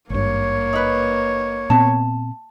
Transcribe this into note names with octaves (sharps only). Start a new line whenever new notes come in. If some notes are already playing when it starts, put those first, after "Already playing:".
G#1 G2 A#3 C#5
D#4 B4
A#2 B3 C4 A5